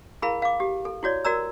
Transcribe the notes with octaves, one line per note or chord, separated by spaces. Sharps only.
E4 G#4 A#4 F5 B5
F5 D6
G4
A4
E4 F#4 C#5 D5
F#4 A#4 D5 A#5 E6